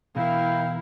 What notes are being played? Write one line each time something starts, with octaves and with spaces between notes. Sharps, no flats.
B2 E3 E4 A#4 F5 G5